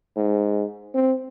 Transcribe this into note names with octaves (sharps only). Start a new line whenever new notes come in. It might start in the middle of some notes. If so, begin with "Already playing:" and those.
G#2
C4